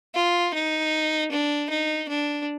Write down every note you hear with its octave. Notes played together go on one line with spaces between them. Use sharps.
F4
D#4
D4
D#4
D4